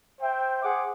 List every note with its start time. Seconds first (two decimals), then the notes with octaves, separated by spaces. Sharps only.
0.21 C5 E5 G5
0.61 G#4 C5 F#5 D6